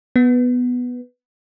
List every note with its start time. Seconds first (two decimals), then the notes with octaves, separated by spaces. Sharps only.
0.16 B3